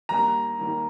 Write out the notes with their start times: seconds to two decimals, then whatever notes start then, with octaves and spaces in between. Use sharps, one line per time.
0.09 D#2 D#3 G3 A#3 A#5
0.59 D#2 D#3 G3 A#3